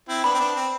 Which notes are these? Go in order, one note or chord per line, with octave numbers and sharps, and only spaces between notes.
C4 E4
B3 D4 B5
C4
B3 D4
C4